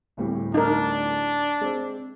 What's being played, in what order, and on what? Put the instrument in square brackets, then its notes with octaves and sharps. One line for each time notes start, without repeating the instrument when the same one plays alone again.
[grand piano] D1 A2 G3
[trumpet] D4 [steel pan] D#4 A#4
[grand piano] G#3 C4